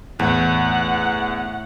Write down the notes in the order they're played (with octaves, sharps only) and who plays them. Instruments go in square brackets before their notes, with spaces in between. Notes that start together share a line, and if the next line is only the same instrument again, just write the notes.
[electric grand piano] E2 [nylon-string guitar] A2 [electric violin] F#5